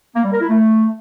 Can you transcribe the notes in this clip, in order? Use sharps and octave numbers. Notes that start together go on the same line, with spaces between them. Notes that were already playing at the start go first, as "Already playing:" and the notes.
A#3
G3
A#4
E4
A3